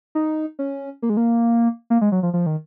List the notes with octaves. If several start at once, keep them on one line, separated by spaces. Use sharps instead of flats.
D#4
C#4
A#3
G#3
A#3
A#3
G#3
F#3
F3
F3
D#3